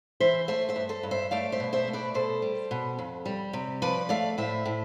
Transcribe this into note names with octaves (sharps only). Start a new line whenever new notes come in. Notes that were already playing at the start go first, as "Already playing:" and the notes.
E3 C5 E5
A3 C5 E5
C5 E5
G2
A4 C5
G2
C5 E5
A3 D5 F5
C5 E5
B2
C5 E5
A3
B4 D5
B2 A4 C5
G3
B2
F2
G3
C3
F3 B4 D5
A3 D5 F5
A2 C5 E5
A2